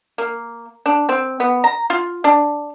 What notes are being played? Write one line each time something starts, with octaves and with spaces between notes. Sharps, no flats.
A#3
D4
C4
B3
A#5
F4
D4